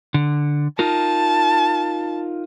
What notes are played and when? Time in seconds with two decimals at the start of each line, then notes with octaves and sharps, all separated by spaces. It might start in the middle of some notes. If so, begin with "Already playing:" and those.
0.14 D3
0.79 D#4 F4 A#4 A5